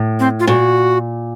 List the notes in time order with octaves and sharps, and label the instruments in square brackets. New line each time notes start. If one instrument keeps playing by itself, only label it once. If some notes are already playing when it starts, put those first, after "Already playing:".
Already playing: [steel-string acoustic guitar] A2
[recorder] C4
F4
[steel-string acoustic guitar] A#2 [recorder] F#4